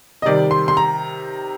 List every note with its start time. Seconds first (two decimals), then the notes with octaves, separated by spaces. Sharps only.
0.22 D#5
0.26 C3 D#3 G3 D5
0.51 C6
0.68 C6
0.77 A#5